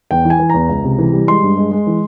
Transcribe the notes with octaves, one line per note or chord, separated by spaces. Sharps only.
E2 G5
E3
G#5
E3
E2 A#5
C#2
C3
E3
G3
G#3 C6
G2
G#3
G#3
E3